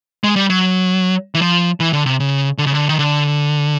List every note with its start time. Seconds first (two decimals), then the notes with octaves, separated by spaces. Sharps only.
0.24 G#3
0.36 G3
0.50 F#3
1.35 E3
1.42 F3
1.80 E3
1.93 D3
2.06 C3
2.20 C#3
2.58 D3
2.67 C#3
2.74 D3
2.89 D#3
2.99 D3